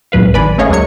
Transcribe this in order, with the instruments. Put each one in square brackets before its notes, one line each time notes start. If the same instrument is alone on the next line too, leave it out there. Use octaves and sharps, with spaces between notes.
[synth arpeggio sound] C#2 A2 F#3 B4 F5
G#1 B4 D5 G#5 B5
A3 C#4 G#4 C#5 D#5 F5
D2 F#3 G#3 A#3 C#5 C#7